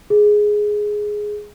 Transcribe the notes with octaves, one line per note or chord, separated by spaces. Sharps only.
G#4